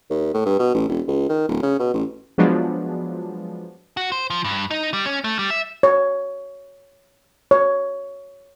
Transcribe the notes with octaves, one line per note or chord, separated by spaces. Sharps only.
D#2
A2
G2
B2
A1
E1
C#2
D#3
D1
C#3
B2
A1
F3 F#3 G#3 B3 D4
F#4
C5
F3
G2
D#4
G3
C#4
A3
G3
E5
C#5
C#5